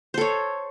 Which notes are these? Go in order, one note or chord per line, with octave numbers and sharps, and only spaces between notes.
A4 C5 C#5